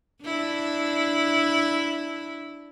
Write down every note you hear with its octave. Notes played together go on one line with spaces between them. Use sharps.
D4 E4